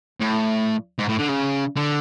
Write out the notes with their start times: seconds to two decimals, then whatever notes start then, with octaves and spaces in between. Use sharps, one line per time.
0.21 A2
0.98 G#2
1.08 A2
1.18 D3
1.28 C#3
1.76 D3